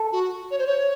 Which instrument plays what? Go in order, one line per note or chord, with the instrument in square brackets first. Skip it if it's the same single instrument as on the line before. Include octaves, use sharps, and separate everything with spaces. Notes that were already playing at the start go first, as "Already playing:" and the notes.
Already playing: [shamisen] A4
[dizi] F#4
C#5
C5
C#5